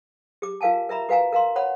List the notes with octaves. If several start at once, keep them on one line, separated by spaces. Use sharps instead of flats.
G4 D6
F4 A#4 F5 G#5 A5
A#4 E5 A#5 B5
F#4 B4 F5 G#5 A#5
A#4 F5 A#5 C6
C#5 F#5 B5